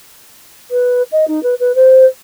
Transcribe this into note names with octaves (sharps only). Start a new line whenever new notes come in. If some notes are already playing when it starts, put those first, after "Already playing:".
B4
D#5
D#4
B4
B4
C5